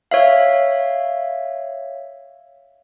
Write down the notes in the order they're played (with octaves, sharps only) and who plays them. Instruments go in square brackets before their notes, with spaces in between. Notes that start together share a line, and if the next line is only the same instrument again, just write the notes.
[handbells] C#5 E5 F5